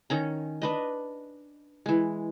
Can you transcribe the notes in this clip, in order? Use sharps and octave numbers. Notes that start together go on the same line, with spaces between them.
D#3 C#4 A#5
D4 B4 D#5
E3 G#3